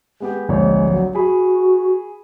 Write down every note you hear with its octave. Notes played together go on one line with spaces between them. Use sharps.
G#3 B3 G4
D1 A#1 G#3 C#5
F#3
F#4 G#4 B5